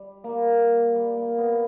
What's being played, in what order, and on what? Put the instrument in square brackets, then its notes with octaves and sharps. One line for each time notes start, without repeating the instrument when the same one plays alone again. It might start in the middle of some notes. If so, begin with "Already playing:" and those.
Already playing: [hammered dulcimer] G3
A#3
G3
G3
A#3
B3